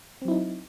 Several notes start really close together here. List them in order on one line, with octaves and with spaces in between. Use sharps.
C4 F#3 E4 D#4